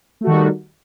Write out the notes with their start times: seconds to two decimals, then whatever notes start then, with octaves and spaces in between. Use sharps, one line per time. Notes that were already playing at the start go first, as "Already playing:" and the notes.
0.21 A3
0.24 F#4
0.27 D#3
0.30 G3